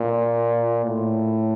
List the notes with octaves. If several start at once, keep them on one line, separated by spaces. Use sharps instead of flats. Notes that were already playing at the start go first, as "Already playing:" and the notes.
Already playing: A#2
A2